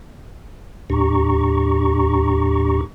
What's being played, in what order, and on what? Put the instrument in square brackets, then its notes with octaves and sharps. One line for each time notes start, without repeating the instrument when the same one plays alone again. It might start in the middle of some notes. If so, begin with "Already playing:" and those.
[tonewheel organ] D#2 A2 D4 G4 A#5 C#6